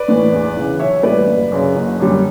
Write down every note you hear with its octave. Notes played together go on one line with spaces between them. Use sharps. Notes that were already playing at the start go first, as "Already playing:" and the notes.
Already playing: B4 D5
A2 E3
E2
C#3 E3
B1 C#5 E5
A2 E3 G3 B4 D5
F#1
F#2 C#3
F#1
F#2 D3 G3